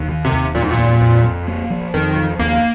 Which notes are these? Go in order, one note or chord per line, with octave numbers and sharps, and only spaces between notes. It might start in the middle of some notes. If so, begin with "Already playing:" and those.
Already playing: D#2
D#3
C3
D#2
F2 A#2
G#2
A#2
A#3
F2
F2
A#3
F3
F2 D#3
F3
D#2 A#3